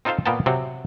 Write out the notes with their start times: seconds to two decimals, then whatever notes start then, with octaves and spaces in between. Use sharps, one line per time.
0.05 C4 D#4 F4 A4 C5 F5
0.26 A#2 A#3 B3 A#4 G5 A5
0.46 C3 F#3 C4 F#4